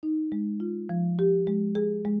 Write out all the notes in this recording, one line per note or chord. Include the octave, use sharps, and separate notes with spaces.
D#4
G#3
F4
F3
G4
G#3
G#4
G#3